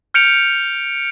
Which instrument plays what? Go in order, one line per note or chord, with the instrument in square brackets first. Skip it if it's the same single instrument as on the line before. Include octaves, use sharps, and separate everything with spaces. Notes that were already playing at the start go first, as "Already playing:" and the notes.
[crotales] F6 G6 C#7 D7 F7